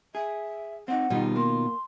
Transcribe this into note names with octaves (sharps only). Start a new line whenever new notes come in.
G#4 E5
C4 C#4 D#4 F#5
B2 D#3 G3 D#4 F4
A#3 C6